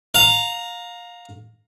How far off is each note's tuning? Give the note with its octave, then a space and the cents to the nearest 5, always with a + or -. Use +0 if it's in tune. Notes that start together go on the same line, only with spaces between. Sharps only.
F5 +25 A#5 -5